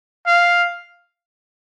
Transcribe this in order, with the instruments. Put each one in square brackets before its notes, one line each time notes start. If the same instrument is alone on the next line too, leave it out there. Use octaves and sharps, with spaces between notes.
[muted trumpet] F5